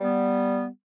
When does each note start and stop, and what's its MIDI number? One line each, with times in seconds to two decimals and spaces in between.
0.01 0.67 55
0.01 0.67 59